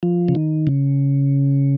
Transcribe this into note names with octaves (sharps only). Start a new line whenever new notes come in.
F3
C#3
D#3
C#3